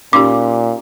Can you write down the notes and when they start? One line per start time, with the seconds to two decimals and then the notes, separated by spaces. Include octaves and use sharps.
0.13 A#2 C#4 D#4 G4 D6